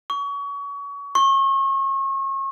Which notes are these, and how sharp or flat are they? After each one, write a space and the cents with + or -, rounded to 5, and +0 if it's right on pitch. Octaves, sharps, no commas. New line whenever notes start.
C#6 +30
C#6 -35